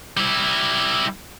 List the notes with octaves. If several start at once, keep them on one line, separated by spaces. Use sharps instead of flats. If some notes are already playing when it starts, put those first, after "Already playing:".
G3 E4